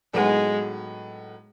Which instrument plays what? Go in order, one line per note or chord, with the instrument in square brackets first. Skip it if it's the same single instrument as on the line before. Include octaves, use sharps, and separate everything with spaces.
[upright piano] A2 F#3 B3 D#4 F#4 [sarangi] G#3